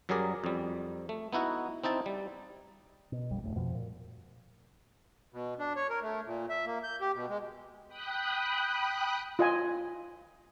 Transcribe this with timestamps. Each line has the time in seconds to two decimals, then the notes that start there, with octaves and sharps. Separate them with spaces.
0.09 F#2 F#3 G3 G#4 A#4 D5
0.44 F2 G3
1.09 A3
1.33 B3 D#4 E4 F#4
1.84 C4 D#4 E4 A5
2.06 G3
3.12 B2
3.30 A#1 F2 G3
3.44 D#1 G2 A3
3.56 F2 B2 F3
3.75 A#2
5.32 B2
5.59 D4
5.76 C#5
5.90 A#4
6.02 A3
6.26 A#2
6.50 E5
6.66 A#3
6.83 G6
7.01 G4
7.14 B2
7.29 G#3
7.88 G5 B5 D#6 F#6
9.39 F4 D#5 G#5